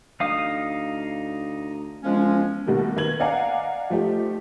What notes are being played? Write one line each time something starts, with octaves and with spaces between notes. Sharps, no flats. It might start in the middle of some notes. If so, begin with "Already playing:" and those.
D2 D#4 F5 D#6
E1 F3 G#3 C#4
B2 D#3 G3 A3 A#3
D#3 B4 G#6 F#7
D5 D#5 F5 F#5 G#5 A#5
F3 A3 D#4 G4